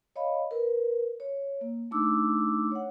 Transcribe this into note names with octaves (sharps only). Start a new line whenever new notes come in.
C#5 D#5 F5 B5
A#4 B4
C#5
A#3
A3 D4 D#4 D6 E6
C#5 F#5